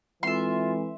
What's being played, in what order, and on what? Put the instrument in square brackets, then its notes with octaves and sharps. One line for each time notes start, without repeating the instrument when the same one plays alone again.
[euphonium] E3 [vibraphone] G#3 C4 A4 [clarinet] F4 [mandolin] E5 C6